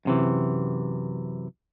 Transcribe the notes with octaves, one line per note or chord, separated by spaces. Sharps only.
F#2 C3 E3